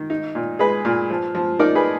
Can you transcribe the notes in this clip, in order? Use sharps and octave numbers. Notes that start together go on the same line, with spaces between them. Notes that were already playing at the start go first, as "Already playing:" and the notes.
Already playing: D#3
D#4
A#2
G#3 G#4 B4
A#2
F3
F3
D#4 A#4 D5
G#4 B4